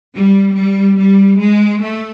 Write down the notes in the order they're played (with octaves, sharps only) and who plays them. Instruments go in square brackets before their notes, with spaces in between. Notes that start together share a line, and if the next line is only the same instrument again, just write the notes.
[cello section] G3
G3
G3
G#3
A3